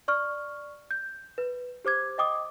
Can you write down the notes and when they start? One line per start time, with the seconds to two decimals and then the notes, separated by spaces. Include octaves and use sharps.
0.08 D5 C#6 F6
0.91 G6
1.38 B4
1.85 G4 C5 D6 G#6
2.18 D#5 G5 D6 D#6